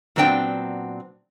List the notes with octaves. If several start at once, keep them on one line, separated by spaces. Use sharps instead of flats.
A#2 F#3 B3 C4 D4 G5